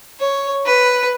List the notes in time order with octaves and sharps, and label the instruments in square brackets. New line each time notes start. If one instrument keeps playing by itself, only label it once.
[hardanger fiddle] C#5
B4